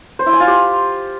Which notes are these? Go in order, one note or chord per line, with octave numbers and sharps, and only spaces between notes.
C5
E4
G#5
F4
G4